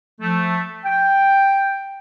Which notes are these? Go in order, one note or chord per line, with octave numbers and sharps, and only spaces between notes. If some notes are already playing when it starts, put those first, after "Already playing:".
F3 A3
G5